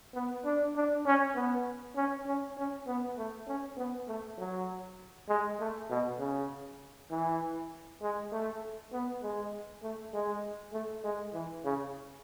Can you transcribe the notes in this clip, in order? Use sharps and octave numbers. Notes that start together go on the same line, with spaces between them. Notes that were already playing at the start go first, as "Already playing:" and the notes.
B3
D4
D4
C#4
B3
C#4
C#4
C#4
B3
A3
C#4
B3
A3
F#3
G#3
A3
B2
C#3
E3
G#3
A3
B3
G#3
A3
G#3
A3
G#3
E3
C#3